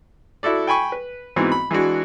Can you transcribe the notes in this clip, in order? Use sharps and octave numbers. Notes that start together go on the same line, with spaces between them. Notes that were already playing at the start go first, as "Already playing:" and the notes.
E4 F#4 A4 D5
G5 G#5 B5 C#6
B4
G#2 E3 B3 C4 F#4
B5
E3 G#3 D4 F#4